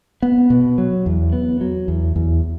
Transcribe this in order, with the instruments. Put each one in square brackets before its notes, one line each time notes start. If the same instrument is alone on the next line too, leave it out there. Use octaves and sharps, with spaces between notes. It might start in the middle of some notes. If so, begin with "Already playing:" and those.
[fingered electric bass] B3
B2
F#3
E2
B3
F#3
E2
E2